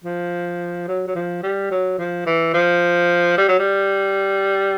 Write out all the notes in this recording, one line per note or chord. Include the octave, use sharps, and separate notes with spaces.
F3
F#3
F#3
F3
G3
F#3
F3
E3
F3
G3
F#3
G3